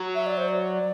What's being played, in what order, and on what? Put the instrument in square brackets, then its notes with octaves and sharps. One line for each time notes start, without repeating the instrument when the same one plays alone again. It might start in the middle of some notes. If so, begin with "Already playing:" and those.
Already playing: [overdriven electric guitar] F#3
[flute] E5
D5
C5
D5